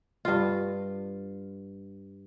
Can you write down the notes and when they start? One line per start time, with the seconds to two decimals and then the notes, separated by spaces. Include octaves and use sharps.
0.25 G2 F4